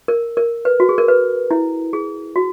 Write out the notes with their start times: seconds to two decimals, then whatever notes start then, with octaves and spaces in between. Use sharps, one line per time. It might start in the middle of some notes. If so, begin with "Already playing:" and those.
0.08 A#4
0.37 A#4
0.65 B4
0.80 F#4
0.89 G#4
0.98 A#4
1.08 B4
1.51 E4
1.93 G#4
2.36 F#4